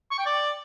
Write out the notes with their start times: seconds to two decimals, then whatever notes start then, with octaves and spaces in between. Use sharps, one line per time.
0.11 C#6
0.18 G5
0.26 D5